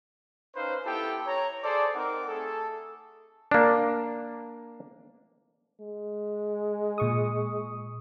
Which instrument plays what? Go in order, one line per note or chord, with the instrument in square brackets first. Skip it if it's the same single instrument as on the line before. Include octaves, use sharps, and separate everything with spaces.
[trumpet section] C#4 D#4 B4 C5 F5
B3 E4 G4 A4 G5
C#5 A#5
G#4 A4 C5 D5
C4 D#4 A#4 F#5 D6
A3 G#4 A4
[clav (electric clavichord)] A#3 D4
[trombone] G#3
[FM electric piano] A#2 C#6 D#6